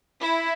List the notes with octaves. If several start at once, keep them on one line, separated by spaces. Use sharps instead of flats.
E4